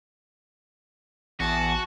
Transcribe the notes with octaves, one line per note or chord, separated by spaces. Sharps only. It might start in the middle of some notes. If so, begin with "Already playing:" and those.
A1 E2 F#4 A5